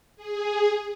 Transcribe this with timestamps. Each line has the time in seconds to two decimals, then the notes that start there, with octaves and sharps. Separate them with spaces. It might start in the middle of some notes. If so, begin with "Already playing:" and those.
0.16 G#4